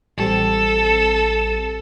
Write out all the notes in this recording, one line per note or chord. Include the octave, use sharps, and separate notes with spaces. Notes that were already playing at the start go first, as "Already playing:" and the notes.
A1 G3 C4 A4